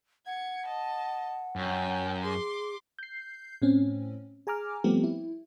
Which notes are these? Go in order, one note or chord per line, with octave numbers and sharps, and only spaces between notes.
F#5 G#6 C#7
D#5 A5
F#2 C#5 G5
G#4 C6 D6
G6 C7
A2 C4 C#4
G#4 G#5 A#5 D6 F6
F3 G3 A3 B3 C4 G4
E4